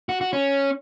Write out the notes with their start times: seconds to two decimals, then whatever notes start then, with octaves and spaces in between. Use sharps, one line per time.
0.09 F#4
0.21 F#4
0.33 C#4